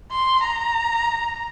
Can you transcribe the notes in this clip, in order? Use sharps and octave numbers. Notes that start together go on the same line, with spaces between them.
C6
A#5